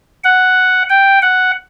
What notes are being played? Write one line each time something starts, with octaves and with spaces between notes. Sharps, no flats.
F#5
G5
F#5